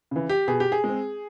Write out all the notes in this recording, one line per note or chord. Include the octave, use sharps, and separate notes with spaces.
C#3 E3
G4
B2 G#4
G4
G#4
G#3 C4